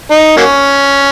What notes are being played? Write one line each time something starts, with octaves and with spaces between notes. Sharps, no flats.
D#4
F#3 A#3 C#4